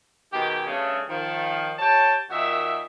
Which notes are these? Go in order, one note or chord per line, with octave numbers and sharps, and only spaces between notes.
B2 D#3 G#3 G4
G2 C#3 A3
D#3 F3 F4
G4 C#5 G5 A5
A#2 D#3 D#4 F#4 E5